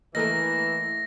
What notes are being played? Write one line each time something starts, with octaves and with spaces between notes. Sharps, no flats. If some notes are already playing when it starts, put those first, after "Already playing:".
E3 A3 A#3 A4 A#4 D#5 A#6